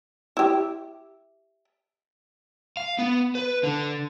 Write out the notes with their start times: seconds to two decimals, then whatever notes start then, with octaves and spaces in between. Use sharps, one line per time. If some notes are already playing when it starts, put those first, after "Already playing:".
0.37 E4 G4
2.77 F5
2.99 B3
3.35 B4
3.63 D3